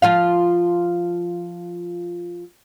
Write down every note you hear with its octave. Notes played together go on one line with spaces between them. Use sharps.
F3 F4 F5